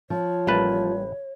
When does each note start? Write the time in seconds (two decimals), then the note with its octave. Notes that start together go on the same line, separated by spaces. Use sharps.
0.10 F3 C#5
0.47 A1 G3 A#3 B4 A5